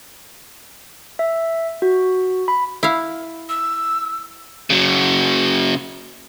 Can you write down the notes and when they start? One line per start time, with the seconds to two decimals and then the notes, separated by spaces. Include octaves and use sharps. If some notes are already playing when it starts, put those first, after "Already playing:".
1.19 E5
1.82 F#4
2.48 B5
2.83 E4 F5
3.49 E6
4.70 C#3 F#3